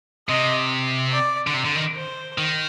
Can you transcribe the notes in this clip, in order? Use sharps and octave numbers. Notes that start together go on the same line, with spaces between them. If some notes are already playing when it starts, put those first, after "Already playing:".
C3 D#5
D5
D3
C3
D3
D#3
C5
D#3